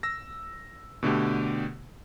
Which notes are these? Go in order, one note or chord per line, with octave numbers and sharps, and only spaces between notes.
E6 A#6
B2 D3 A3 G4